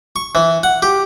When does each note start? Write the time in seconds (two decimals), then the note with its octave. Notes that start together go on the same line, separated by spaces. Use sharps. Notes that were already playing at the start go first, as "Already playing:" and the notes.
0.16 C#6
0.35 E3
0.63 F#5
0.82 G4